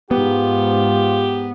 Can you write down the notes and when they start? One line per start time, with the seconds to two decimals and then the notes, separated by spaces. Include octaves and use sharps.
0.11 G#2 B3 F4 G4